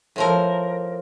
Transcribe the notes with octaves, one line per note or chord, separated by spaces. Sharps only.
A2 F3 A#4